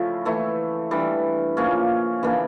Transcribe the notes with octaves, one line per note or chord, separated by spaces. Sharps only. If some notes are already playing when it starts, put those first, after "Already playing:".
Already playing: C#3 F3 A3 E4
E3 A3 E4
E3 G3 D4
C#3 F3 A#3 C#4
C#3 E3 A#3 D4